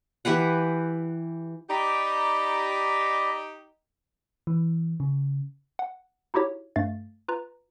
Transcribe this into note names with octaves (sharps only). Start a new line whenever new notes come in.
E3 G4 B4 F#5
D#4 G4 D5 A#5 B5
E3
C#3
F#5
D#4 E4 F#4 G4 C#5
G2 A3 F5 A6
F4 B4 A#5